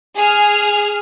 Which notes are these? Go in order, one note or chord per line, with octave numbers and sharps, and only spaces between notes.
G#4 F6